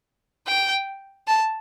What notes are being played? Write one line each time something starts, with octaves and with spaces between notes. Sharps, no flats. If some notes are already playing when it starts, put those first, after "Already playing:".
G5
A5